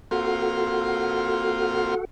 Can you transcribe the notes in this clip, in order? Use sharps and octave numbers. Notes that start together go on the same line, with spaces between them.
A#3 C4 F4 F#4 A4 F#5